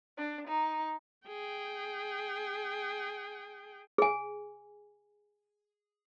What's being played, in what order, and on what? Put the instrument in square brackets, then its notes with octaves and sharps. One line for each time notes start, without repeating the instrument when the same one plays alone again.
[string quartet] D4
D#4
[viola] G#4 G5
[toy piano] G#4 G#5